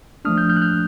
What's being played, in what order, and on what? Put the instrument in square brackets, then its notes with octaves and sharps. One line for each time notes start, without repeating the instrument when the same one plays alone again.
[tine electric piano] F3 A3 D4 D#6 F6
F6 G6
F6 G6
F#6
F6 G6